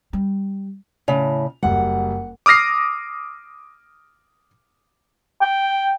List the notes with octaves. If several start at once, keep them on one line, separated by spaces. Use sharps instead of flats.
G3
A2 C#3 F7
F#1 G3 F#5
D6 D#6 F6 A#6 C7
G5